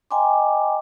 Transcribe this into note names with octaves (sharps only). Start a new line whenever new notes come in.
D#5 G5 G#5 A#5 C6 D6